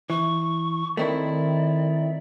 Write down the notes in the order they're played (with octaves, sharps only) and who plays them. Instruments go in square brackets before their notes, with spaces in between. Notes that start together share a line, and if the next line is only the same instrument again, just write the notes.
[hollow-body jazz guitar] E3 [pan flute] C#6
[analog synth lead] D#3 [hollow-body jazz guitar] A3 C4 E4 [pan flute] D5